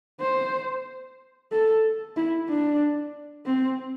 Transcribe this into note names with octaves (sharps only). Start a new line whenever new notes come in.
C5
A4
E4
D4
C4